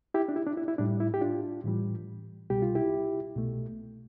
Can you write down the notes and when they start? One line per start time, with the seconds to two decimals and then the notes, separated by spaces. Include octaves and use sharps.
0.14 E4 G4
0.29 D4
0.36 E4
0.47 D4
0.57 E4
0.68 E4
0.78 A2 G3 D4
1.00 E4
1.14 G4
1.21 D4 F4
1.64 A2 E3 G3
2.50 C2 B2 G3 G4
2.62 F4
2.75 E4 G4
3.35 C2 B2 A3